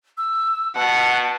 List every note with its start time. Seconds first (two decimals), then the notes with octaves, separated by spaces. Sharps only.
0.17 E6
0.76 B2 F#5 A5